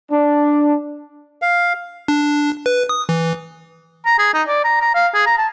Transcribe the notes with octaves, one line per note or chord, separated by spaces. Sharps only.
D4
F5
D4
B4
D#6
E3
A#5
G#4
D#4
D5
A#5
A#5
F5
G#4
A#5
A5